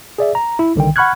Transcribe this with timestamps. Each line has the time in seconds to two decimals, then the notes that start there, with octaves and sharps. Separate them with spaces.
0.18 G#4 D5 E5
0.35 A#5
0.59 E4
0.76 C2 D3 D#3 G5
0.96 F#5 B5 C#6 F6 F#6 G#6